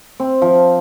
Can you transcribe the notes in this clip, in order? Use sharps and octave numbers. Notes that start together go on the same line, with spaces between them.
C4
F3